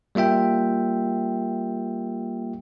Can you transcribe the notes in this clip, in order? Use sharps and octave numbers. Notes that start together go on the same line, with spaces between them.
G3 A#3 F4 E5 G5